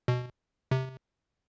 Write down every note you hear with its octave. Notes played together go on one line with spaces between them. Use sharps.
B2
C3